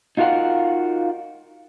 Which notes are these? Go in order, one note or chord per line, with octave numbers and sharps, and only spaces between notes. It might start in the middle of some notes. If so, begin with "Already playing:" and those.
D#4 F4 F#4 A#4 F5 F#5